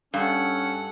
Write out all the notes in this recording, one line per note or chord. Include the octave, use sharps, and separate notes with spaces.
G2 C#4 A4 F#5